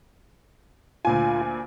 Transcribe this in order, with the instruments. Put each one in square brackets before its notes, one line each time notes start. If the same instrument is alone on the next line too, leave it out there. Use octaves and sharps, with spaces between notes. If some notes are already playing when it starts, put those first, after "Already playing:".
[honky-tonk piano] D2 A#2 G#5 [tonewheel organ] F4